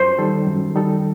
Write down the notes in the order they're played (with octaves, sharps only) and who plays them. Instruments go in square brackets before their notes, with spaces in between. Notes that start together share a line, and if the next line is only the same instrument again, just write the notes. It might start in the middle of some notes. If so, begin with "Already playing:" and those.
Already playing: [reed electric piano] F#2 [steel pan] C5
[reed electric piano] D#3 G3 D#4 A4
F#2
D#3 G3 D#4 A4